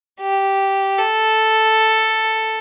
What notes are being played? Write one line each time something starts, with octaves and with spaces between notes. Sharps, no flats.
G4
A4